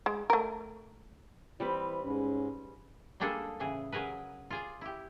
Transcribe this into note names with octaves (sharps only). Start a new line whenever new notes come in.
G#3
A3 A#4
E3 G3 C4 B4 C5
G#2 C#4
G3 G#3 A#3 D4 G#4 A4
A2 C#3 E3 G#4
F#3 G#4 A#4 B4
F4 G#4 D5
E4 G4